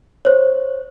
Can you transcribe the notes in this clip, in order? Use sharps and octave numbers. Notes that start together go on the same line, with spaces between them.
C5 C#5